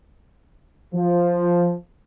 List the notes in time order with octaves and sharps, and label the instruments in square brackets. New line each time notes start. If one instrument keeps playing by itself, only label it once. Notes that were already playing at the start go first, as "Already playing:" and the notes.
[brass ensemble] F3